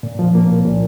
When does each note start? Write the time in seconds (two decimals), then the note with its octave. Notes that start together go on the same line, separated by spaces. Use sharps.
0.03 A#2
0.19 F3
0.35 A#3
0.49 C2
0.65 A#2